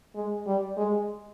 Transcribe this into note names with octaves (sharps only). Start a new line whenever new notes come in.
G#3
G3
G#3